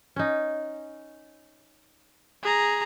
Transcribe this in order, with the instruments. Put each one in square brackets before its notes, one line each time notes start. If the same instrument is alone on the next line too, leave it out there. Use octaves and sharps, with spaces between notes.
[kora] C#4 D#4
[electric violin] G#4 A#5